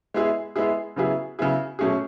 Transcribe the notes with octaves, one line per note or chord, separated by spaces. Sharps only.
G#3 B3 E4 G#4
G#3 B3 E4 G#4
C#3 F#3 B3 E4 G#4
C#3 F#3 B3 E4 G#4
B2 F#3 A3 C#4 G#4